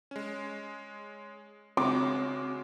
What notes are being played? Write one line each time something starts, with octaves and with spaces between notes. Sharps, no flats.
G#3 C#4
C#3 G#3 C4 F#4 D6